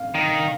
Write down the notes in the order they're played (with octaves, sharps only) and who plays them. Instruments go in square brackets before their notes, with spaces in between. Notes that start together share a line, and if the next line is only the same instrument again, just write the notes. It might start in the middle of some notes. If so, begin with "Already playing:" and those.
Already playing: [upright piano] F5
[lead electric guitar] D#3